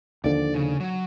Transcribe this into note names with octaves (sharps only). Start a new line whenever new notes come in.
D#2 D3 F3 D5
C#3
F#3